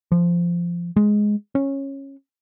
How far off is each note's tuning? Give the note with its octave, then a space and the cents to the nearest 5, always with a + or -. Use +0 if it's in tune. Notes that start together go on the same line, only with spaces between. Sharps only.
F3 -15
G#3 +5
C#4 -15